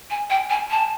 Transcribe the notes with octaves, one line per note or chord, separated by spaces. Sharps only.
G#5
G5
G#5
A5